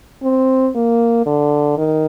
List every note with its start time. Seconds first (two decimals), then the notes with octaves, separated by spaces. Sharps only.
0.23 C4
0.75 A#3
1.26 D3
1.77 D#3